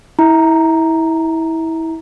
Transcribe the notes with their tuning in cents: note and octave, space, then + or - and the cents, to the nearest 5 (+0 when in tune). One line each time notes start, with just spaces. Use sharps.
E4 -25 A#5 +0